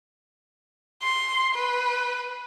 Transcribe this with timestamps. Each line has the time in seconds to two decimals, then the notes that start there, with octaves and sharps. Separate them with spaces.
1.03 C6
1.55 B4